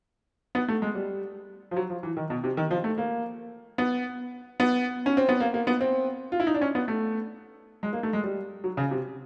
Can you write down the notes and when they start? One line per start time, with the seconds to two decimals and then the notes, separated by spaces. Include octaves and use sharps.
0.55 B3
0.68 A3
0.82 G#3
0.95 G3
1.71 F3
1.76 F#3
1.90 F3
2.03 E3
2.17 D#3
2.30 B2
2.44 C3
2.57 D#3
2.71 F3
2.84 A3
2.98 A#3
3.78 B3
4.60 B3
5.06 C#4
5.17 C4
5.29 B3
5.40 A#3
5.54 A#3
5.67 B3
5.81 C4
6.32 F4
6.40 E4
6.47 D#4
6.54 D4
6.61 C#4
6.75 B3
6.88 A3
7.83 G#3
7.93 A#3
8.03 A3
8.13 G#3
8.24 G3
8.64 F#3
8.77 C#3
8.91 C3